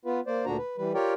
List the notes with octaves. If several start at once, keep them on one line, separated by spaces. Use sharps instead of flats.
B3 F4 B4
A#3 C5 D5
D2 A#2 D3 D4 F#4 A#5
B4
E3 G3 B4
F4 G4 A#4 C#5 D5 G5